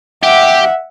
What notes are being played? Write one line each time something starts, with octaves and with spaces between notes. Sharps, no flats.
G4 E5 F#5